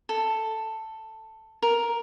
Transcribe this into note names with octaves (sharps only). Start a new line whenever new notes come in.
A4
A#4